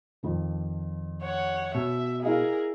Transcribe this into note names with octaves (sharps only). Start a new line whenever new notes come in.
F2 D#3 F3
C#5 F#5
B2 E5
E4 G#4 A#4 D#5 F5